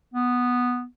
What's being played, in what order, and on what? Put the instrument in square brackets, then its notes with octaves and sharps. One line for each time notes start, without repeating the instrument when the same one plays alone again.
[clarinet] B3